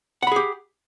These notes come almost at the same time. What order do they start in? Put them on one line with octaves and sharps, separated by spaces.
F#5 B5 G#4 G4